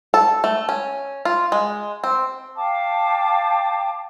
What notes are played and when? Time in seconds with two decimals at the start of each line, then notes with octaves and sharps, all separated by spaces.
0.14 A4
0.44 A3
0.69 C#4
1.25 F4
1.52 G#3
2.04 C4
2.55 F5 G5 A5 D6